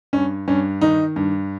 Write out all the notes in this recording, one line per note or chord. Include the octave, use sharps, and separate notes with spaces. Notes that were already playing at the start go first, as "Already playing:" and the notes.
G2 C#4
G2 C#4
D#3 D#4
G2